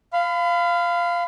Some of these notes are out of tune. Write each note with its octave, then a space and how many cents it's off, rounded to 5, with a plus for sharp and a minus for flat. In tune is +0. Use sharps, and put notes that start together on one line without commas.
F5 -5 B5 +35